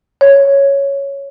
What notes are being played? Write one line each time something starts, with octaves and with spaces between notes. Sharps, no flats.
C#5